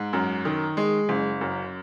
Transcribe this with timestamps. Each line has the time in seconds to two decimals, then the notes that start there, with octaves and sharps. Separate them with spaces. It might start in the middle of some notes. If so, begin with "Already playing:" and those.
Already playing: G#2
0.13 F#2
0.45 D#3
0.77 G#3
1.09 F#1
1.41 F#2